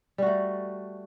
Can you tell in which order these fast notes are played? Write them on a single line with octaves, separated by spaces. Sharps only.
G3 F#4 A3